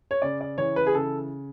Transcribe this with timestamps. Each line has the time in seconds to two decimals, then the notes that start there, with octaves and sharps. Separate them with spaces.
0.11 C#5
0.22 C#3 D5
0.41 D5
0.58 E3 C#5
0.76 B4
0.86 G#4
0.95 C#3 A4